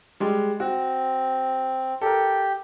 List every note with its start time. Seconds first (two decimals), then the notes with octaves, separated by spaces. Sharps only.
0.20 G3 G#3
0.60 C4 F#4
2.01 G4 A4 A#4